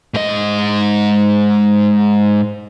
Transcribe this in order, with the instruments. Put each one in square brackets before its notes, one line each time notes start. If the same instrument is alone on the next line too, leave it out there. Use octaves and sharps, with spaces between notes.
[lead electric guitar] G#2 D#5